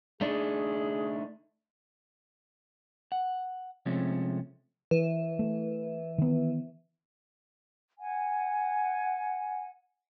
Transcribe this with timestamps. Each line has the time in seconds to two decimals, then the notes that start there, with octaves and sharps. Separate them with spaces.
0.21 A3 D4 D#4 G#4
3.12 F#5
3.86 C3 F3 G#3 A3 C4 C#4
4.91 E3
5.39 A3
6.18 D#3 B3
7.99 F#5 G#5